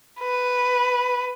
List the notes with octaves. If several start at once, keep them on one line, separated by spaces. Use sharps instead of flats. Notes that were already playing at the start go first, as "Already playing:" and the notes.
B4